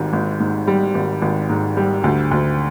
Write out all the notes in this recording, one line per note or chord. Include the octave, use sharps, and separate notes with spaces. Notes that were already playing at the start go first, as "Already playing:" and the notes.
Already playing: G#1 G#2 G3
G#1
G#2
G3
G#1
G#1
G#2
G3
D2
D2